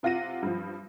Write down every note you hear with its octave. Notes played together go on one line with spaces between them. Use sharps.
C3 F4 F#5 A#6 D#7
G2 F3